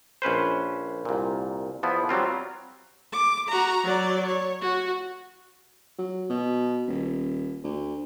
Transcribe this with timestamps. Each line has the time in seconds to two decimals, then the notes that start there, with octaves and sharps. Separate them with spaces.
0.22 A#1 C#4 B4 C5
1.05 C2 A#2
1.83 E2 F3 B3 E4
2.09 F#3 G3 C4 F4
3.12 D6
3.49 F#4 A#5
3.84 F#3 D5
4.26 C#5
4.61 F#4
5.98 F#3
6.30 B2
6.88 D#1
7.64 D2